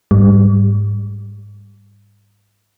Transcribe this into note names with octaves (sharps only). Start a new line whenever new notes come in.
G#2 G3